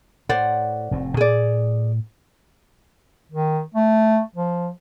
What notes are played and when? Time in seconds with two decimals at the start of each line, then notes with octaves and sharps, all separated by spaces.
0.29 A2 C5 D5 F#5
0.91 F1 A2 C4
1.17 A2 G#4 D5
3.32 D#3
3.74 A3
4.36 F3